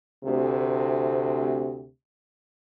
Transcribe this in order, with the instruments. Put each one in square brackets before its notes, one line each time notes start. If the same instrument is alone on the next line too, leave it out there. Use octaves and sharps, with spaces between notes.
[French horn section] D2 C3